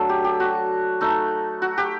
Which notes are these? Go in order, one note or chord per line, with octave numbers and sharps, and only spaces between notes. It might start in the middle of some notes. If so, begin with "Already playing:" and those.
Already playing: F#3 A3 D4 A4
G4
G4
F#4
A3 D#4
F#4
G4